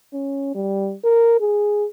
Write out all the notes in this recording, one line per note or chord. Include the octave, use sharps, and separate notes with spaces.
C#4
G3
A#4
G#4